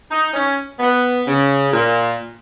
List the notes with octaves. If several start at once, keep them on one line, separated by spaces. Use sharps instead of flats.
D#4
C#4
B3
C#3
A#2